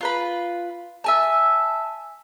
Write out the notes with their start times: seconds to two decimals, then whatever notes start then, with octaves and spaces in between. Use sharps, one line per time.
0.01 F4 B4 B5
1.04 E5 G#5 A5